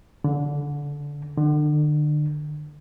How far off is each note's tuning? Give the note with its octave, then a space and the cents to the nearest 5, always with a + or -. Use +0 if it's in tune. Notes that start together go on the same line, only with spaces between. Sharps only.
D3 -20
D3 +35